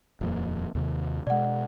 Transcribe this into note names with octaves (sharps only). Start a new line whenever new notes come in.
D#1 F2 A#3
D#2 C3 D#3
B2 G#3 D5 F#5